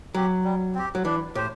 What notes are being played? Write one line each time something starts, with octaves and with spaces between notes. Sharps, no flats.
F#3 C4 G4
G3
C4 G4
F#3
E3 D4
A2 G4 C5